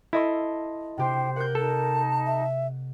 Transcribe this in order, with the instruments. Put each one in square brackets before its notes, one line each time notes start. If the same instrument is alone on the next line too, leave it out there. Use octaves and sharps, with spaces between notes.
[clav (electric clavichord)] E4 [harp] A4 D#5 C6
[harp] C3 G4 [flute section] C5 [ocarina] G5
[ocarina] A#4 [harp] F#5 G6
[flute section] D#4 A5 [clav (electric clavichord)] A4
[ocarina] E5